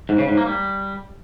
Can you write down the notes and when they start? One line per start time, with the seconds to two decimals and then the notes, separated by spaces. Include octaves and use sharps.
0.09 G#2
0.18 C#3
0.28 G#2
0.37 A#3
0.47 G3